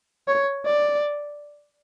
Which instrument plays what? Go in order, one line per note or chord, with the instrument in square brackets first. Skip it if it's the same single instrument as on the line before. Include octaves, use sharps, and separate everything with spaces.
[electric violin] C#5
D5